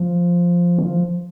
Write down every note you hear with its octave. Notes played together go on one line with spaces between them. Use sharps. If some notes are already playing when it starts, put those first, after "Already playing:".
Already playing: F3
D#3
F3